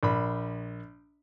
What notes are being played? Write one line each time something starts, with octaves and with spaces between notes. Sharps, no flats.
A#1 B5